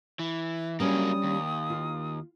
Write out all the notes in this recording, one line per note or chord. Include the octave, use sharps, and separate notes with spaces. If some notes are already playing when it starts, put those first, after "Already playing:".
E3
F#3 G3 A#3 C#4 D4 D#6
D#2
F4